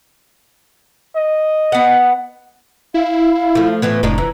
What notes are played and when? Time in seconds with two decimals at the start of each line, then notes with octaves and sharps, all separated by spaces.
1.15 D#5
1.72 B3 F#5
2.94 E4 F5
3.55 F3 A3
3.82 A2 E3 B3
4.03 F1 A2 D4 D#4 A#5
4.18 E3